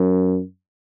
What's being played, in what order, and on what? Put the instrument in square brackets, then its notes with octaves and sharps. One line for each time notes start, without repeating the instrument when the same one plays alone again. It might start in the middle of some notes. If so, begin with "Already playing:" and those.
Already playing: [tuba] F#2